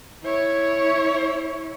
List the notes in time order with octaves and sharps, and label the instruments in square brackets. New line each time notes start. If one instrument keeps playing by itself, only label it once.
[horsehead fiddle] E4 C#5